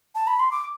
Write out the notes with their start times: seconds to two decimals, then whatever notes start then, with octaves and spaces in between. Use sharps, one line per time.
0.15 A5
0.27 B5
0.40 C6
0.51 D6